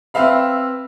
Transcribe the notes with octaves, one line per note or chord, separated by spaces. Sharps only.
C4 B4 E5 F5 B5